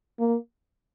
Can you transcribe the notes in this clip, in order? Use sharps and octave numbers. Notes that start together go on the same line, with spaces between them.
A#3